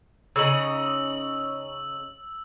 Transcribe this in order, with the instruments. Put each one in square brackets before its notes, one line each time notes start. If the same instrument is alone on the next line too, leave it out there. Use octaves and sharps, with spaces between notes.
[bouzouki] C#3 D#4 [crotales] E6 F#7